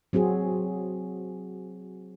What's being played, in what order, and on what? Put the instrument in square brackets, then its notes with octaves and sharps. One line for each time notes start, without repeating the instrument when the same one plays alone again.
[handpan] F#3 C4 F#4 G#4